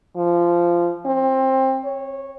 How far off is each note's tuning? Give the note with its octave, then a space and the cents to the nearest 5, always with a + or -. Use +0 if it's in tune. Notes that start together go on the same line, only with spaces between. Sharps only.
F3 -15
C4 +20
C#5 -15